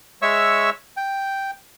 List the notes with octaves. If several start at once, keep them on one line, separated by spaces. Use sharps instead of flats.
G#3 C#5 E5 C#6 E6
G5